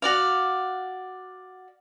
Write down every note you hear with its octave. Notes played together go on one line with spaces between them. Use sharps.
F#4 D5 F5